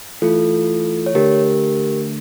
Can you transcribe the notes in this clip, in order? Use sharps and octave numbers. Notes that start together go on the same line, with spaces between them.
E3 A3 E4 F4 A4
C#5
D3 A3 D4 G4 A#4